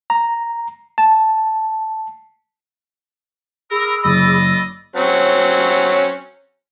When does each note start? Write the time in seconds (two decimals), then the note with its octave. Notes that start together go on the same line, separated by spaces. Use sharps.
0.10 A#5
0.98 A5
3.71 G#4 A#4 B5 E6
4.05 F#1 D5 D#5
4.96 F#3 C4 C#4